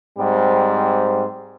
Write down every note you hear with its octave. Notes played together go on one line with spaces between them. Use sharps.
G#2 G3 C4